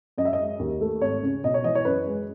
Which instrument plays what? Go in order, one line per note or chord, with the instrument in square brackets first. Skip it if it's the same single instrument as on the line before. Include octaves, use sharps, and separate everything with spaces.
[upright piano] F#2 D#5
E5
D#5
G#3
D#2
A3
G#1 C#5
C#3
B1 D#5
C#5
E3 D#5
C#5
F#2 B4
G#3